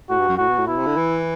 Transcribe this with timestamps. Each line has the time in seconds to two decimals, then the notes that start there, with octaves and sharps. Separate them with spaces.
0.10 A2 F#4
0.18 G2
0.29 F#2
0.38 A2 F#4
0.48 B2
0.58 A2
0.67 B2 E4
0.77 C3
0.86 D3
0.97 E3